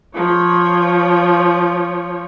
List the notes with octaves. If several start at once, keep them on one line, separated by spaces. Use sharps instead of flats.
F3 C#5